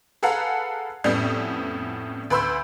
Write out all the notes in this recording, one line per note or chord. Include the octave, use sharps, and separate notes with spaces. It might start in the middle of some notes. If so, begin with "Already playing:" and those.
G#4 A4 B4 F5 F#5 A#5
F2 A2 G3 B3 C#4
D2 B4 B5 C6 E6 G6